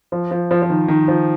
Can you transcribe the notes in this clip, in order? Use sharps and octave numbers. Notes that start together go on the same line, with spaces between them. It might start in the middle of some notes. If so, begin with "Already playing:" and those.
F3
F3
F3
F3
D#3
D#3
F3